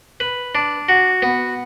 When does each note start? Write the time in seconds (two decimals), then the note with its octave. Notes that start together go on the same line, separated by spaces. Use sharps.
0.20 B4
0.55 D4
0.89 F#4
1.22 B3